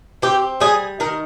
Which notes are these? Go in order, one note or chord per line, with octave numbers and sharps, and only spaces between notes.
C4 G4
G3 G#4
D#3 A#4